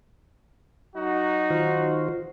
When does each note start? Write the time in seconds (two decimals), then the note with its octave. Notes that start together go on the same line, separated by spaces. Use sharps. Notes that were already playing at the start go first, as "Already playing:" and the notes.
0.96 F#3 D#4 F#4
1.50 D#3 F4 C5